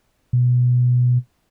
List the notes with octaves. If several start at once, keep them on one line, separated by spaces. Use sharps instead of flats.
B2